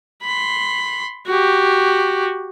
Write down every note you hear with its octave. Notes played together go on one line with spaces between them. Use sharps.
B5 C6
F#4 G4